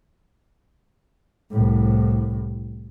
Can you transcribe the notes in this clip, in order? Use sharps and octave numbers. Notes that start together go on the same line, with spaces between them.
C2 A2